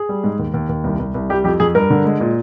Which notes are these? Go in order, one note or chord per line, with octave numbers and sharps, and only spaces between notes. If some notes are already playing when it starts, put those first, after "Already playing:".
Already playing: G#4
G3
G#2
D#2
D#2
D#2
C2
C2
C2
G3 G4
F2 G4
F2 G#4
G2 A#4
D3
G#3
A#2